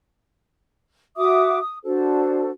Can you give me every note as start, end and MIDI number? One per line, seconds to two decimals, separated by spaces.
1.16 1.59 66
1.16 1.59 76
1.16 1.59 86
1.16 1.59 87
1.60 1.78 87
1.84 2.50 62
1.84 2.50 66
1.84 2.50 69
1.84 2.50 72